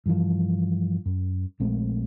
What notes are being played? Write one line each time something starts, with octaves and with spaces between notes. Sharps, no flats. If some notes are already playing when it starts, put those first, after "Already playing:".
G2 E3 F3
F#2
A#1 G#3 A3 C4